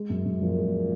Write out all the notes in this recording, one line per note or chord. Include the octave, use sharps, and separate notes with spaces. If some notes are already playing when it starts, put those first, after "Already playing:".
Already playing: G#3
F#2
F#2
A#2 F3
G#3